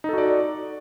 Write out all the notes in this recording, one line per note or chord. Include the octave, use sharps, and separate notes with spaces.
D#4 F#4 A4 D5